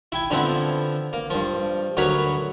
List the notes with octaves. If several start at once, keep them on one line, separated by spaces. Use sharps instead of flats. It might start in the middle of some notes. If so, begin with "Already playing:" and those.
E4 G5 G#5
D3 F3 B3 C4 E4
A#3
G2 F3
D2 F#3 A#4 B4 C#5 B5